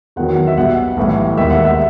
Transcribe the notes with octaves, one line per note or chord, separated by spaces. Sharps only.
E2 D#3 F#3 F#5
E5
B1 B2 G3 F#5
B1 A2 E3 G3
E1 D#2 D#3 E5
F#5
E5